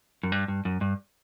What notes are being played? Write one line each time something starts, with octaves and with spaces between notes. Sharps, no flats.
F#2
G2
G2
F#2
G2